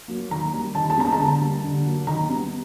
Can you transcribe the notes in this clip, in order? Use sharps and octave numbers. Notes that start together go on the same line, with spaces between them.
F#3 A#3
D#3 A#5
G3 A#3
D#3 A5
A5
G#3 B3 A#5
A5
A#5
D3 A5
G3 A#3
D3
F#3 A#3
D#3 A#5
G3 B3